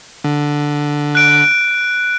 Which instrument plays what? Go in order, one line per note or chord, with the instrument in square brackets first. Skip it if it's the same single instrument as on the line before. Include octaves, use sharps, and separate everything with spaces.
[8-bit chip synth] D3
[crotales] F#6 D7